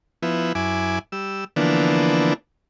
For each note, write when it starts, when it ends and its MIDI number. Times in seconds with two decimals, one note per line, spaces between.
0.23 0.53 53
0.23 0.53 59
0.23 0.53 64
0.55 0.99 42
0.55 0.99 64
0.55 0.99 80
0.55 0.99 86
1.12 1.44 55
1.12 1.44 88
1.56 2.34 50
1.56 2.34 52
1.56 2.34 53
1.56 2.34 58
1.56 2.34 59
1.56 2.34 62